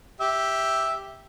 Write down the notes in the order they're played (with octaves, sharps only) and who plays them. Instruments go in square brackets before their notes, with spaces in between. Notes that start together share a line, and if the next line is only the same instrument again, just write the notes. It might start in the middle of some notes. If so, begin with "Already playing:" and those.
[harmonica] G4 E5